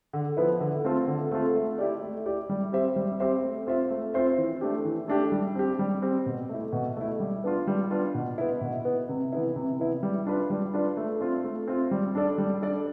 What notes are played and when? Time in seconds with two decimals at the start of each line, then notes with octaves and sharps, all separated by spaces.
0.13 D3
0.37 F3 B3 E4 B4
0.61 D3
0.84 A3 C4 F4 A4
1.08 D3
1.31 A3 C4 F4 A4
1.55 A3
1.78 E4 G4 D5
2.02 A3
2.26 E4 G4 D5
2.49 G3
2.72 C4 G4 C5 E5
2.96 G3
3.20 C4 G4 C5 E5
3.43 A3
3.67 C4 F4 C5 E5
3.90 A3
4.14 C4 F4 C5 E5
4.38 E3
4.61 A3 D4 G4
4.85 E3
5.08 A3 D4 G4
5.32 G3
5.55 C4 G4
5.79 G3
6.02 C4 G4
6.26 B2
6.49 A3 E4
6.73 B2
6.97 A3 E4
7.20 G3
7.44 B3 D4 F4
7.67 G3
7.91 B3 D4 F4
8.15 B2
8.38 B3 E4
8.61 B2
8.85 B3 E4
9.09 C3
9.32 E3 B3 E4
9.56 C3
9.80 E3 B3 E4
10.03 G3
10.27 D4 F4 B4 D5
10.50 G3
10.74 D4 F4 B4 D5
10.97 A3
11.21 C4 F4
11.44 A3
11.68 C4 F4
11.91 G3
12.15 D4 A4 D5
12.38 G3
12.62 D4 A4 D5